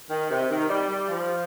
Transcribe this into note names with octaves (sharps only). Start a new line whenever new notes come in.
D#3
C3
D#3
G3
G3
F3